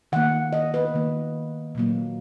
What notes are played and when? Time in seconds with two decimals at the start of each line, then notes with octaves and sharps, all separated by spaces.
0.12 D#3 A#3 F#5
0.53 D#5
0.74 B4
0.94 D#3 A#3
1.75 A#2 F#3 A#3